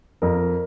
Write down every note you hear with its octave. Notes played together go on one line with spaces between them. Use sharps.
F2 A#4